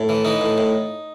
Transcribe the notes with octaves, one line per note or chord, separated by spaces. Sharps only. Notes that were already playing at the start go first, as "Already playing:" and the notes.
Already playing: A2
E3
E3 D#4
A2
A2